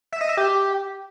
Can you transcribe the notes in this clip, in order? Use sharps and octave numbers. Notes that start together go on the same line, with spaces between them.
E5
D#5
E5
G4